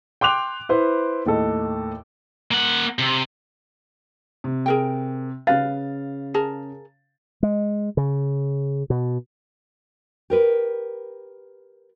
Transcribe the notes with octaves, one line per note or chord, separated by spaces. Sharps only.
G5 C6 D6 F#6 F7
E4 B4 C5
D#2 A2 A4 D#5
A#3 F#5
C3
C3
G#4 A#4 G5
C#3 B4 F5 A6
G#4 A#4 A5
G#3
C#3
B2
G4 A#4 B4